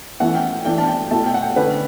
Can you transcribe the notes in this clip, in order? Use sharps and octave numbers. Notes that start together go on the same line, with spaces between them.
E3 A3 C#4 E4 F#5
G5
E3 A3 D4 G5
A5
G5
B2 A3 E4 A5
G5
F#5
G5
D3 A3 C#4 B4